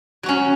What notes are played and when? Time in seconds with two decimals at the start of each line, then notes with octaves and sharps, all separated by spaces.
0.23 F#3
0.26 F#4
0.29 C#4